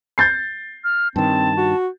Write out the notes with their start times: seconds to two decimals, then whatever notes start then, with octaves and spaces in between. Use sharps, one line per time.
0.18 G6 A6 C7
0.84 F6
1.16 G2 D#3 C4 A5
1.57 F#4